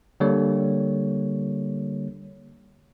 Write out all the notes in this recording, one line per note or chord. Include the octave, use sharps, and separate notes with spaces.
D3 G3 A#3 C#5